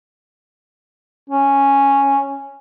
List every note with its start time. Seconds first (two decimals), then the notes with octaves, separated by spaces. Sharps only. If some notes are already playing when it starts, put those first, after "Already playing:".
1.30 C#4